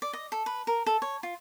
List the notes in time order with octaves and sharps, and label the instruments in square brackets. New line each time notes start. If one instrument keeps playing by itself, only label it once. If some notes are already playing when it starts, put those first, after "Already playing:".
[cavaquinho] D5
D#5
A4
B4
A#4
A4
C#5
F4